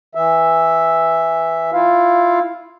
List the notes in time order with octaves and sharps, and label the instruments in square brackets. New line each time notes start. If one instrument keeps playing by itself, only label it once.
[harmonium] E3 E5
E4 F4 F5